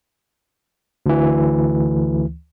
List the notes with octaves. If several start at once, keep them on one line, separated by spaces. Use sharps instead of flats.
D2 E3